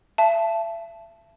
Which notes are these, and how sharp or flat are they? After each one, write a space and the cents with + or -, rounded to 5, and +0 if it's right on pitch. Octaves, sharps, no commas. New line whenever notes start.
E5 +35 A5 -10